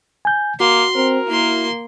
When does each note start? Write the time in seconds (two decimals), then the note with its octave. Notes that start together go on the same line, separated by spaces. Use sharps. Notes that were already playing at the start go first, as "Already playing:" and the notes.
0.25 G#5 G6
0.60 A#3 F#4 C6
0.95 C4 A#4
1.27 A#3 E4 C6